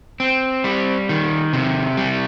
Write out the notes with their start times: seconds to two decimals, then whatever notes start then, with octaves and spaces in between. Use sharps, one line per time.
0.20 C4
0.64 G3
1.09 D#3
1.53 C3
1.97 G3